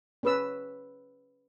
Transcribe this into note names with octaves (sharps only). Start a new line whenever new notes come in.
C#4 B4 E6